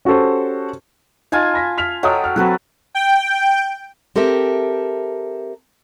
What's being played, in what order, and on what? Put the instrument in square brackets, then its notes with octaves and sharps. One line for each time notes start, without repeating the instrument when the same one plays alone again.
[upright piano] C#4 F#4 G4 A4 C5
[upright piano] D#4 [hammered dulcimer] F4 G#5 A5
[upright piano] B5 A#6 B6
F6 B6 F7
[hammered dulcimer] F#3 A4 G5 [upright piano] D#5 F#5 D#6
[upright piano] F6
[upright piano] F#3 C4 [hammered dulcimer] F#4 A4 B4
[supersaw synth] G5
[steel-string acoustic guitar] C4 G4 A4 A#4 E5